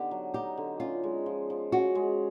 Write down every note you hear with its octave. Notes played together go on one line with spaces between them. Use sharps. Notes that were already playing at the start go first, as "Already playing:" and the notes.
Already playing: D3 B3 D#4 G4
F#3
D#4 G4
D3
C#4 F4
G#3
F3
F3
C#4 F#4
G#3